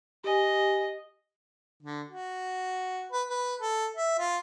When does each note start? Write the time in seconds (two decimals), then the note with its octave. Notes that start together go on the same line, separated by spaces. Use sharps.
0.24 G4 D#5 G#5
1.83 D3
2.10 F#4
3.12 B4
3.29 B4
3.61 A4
3.97 E5
4.19 F4